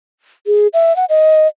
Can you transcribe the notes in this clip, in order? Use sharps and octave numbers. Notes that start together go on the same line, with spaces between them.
G#4
E5
F#5
D#5